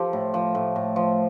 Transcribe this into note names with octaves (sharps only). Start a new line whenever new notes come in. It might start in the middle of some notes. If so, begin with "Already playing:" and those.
Already playing: F3 G4 A4
A2
F3
A2
A2
F3